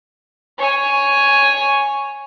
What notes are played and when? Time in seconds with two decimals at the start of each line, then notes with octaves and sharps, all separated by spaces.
0.58 C#5 G#5